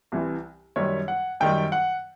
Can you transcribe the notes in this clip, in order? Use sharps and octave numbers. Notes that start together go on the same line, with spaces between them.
C2 C3 E3
F#2 D#3 G3 C#5
F#5
F#2 D#3 G3 G5
F#5